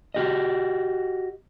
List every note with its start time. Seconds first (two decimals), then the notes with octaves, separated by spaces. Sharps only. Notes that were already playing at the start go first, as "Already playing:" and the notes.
0.14 F#4 G4 D#5